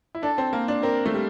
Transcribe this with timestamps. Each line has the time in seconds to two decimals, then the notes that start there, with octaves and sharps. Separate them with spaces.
0.15 E4
0.22 D4 A4
0.38 C4
0.53 A#3
0.68 D4
0.83 C4 A#4
1.06 A3
1.14 G3